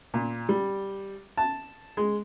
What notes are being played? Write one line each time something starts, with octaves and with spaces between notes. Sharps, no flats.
A#2
G3
A5
G#3